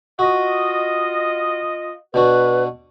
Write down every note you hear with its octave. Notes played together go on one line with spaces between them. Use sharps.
F4 F#4 D#5
B2 D4 F#4 B4